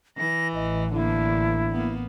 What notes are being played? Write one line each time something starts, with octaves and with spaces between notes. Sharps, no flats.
E3 A#6
A1 D#5
D3 A#3 D4 E4
A#3 B3